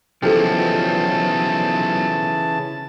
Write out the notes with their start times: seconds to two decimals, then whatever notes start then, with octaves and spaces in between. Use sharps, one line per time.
0.22 B1 C#3 E3 F3 G4 A4 A5